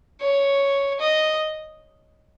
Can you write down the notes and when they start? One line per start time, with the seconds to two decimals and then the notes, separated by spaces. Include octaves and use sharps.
0.21 C#5
1.00 D#5